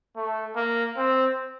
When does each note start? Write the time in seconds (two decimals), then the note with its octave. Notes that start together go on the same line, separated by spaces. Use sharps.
0.16 A3
0.56 A#3
0.97 C4